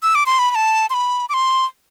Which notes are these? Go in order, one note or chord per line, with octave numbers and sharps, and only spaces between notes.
E6
D6
C6
B5
B5
A5
C6
B5
D6
C6